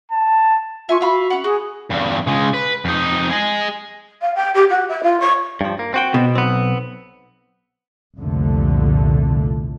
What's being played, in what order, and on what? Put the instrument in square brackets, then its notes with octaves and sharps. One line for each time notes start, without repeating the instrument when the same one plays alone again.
[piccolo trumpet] A5
[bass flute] F4 [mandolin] E5 G#5 C#6
[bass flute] F#4 [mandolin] E5 F5 B5
[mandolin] C#4 F#5
[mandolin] F#4 [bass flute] G#4
[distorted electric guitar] E2 G2
C#3 G#3
B4
F2 D#4
G#4 D#5
[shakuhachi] F5
G5
G4
F#4
E5
F4
C#6
[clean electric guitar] G2 F3
A#3
C4 F#4 G5
[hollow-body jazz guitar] B2
[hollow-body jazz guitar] B1 [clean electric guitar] B3 C4
[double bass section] C2 F2 A#2 D3 A3